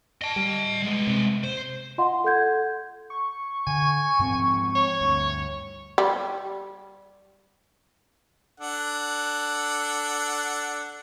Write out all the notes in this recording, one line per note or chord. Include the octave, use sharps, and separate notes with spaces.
D#5 A5
G3
G#3 B3
C3
C5
F4 D#5 F5 F#5 C6
A4 F#5 G6 G#6
C#6
D3 G#5
G#2 F3 C4
C#5
D2 G2
G3
D4 A4 F#5